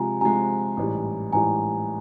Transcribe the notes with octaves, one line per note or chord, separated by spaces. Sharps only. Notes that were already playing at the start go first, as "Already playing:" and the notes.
Already playing: C3 F3 G#3 G#5 A#5
C3 F3 G#3 G#5 A#5
A1 G#2 E3 G3
A1 G#2 E3 G3 G#5 A#5